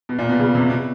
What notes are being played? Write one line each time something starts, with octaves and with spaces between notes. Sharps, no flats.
B2
A#2
B2
C#3
C3
B2